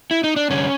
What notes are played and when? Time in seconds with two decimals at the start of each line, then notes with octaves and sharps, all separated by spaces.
0.11 E4
0.24 D#4
0.36 D4
0.50 G2 D3 C#4